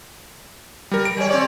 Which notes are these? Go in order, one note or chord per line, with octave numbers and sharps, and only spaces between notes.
G3 A#4
D7
G3 C#5
C4 C#5 D5